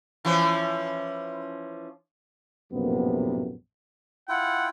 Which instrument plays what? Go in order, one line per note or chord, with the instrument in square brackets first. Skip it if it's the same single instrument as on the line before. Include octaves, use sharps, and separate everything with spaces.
[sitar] E3 F3 C#4
[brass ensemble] A#1 F#2 A2 C3 A#3 B3
[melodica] E4 F4 G5 [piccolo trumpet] F#5